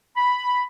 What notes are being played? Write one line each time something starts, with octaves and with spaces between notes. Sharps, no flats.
B5